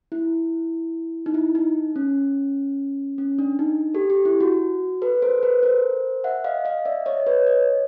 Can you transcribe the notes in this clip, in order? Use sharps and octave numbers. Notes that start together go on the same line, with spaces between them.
E4
D#4
E4
D#4
C#4
C#4
D4
D#4
G4 A4
G4
E4
F#4
A4 B4
A#4 C5
A4 B4
A#4 C5
E5 F#5
D#5 F5
D#5 F5
D5 E5
C#5 D#5
B4 C#5
C#5 D#5